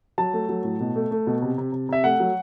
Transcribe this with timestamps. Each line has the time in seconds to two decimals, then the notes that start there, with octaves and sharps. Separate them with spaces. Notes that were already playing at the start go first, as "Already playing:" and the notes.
0.18 F#3 A5
0.34 A3
0.49 F#3
0.64 A2
0.80 B2
0.96 A3
1.11 A3
1.27 B2
1.42 C3
1.58 C3
1.72 C3
1.89 C3 E5
2.04 A3 F#5
2.20 F#3